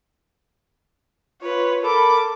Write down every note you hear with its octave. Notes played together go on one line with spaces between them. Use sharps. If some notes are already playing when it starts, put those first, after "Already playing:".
F4 B4 C#5
A4 A#4 B5 D6